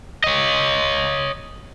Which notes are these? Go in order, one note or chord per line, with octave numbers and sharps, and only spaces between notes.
C#5 D#5